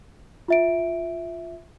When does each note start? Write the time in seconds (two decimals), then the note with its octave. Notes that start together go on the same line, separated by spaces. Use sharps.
0.48 F4 E5 D7